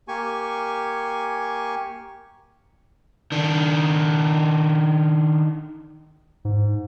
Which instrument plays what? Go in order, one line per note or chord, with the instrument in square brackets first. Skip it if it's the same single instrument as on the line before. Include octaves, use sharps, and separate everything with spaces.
[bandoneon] A#3 G4 G#5 C#6
[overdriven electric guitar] D#3 D4
[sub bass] G#2